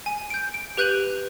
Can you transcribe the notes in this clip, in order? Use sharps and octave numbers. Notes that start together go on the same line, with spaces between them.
G#5
G6 D7
D7
G4 B4 F#6 G6 D#7 F#7